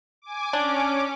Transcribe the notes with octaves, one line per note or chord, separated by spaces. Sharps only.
G#5 D6
C#4 D4 D6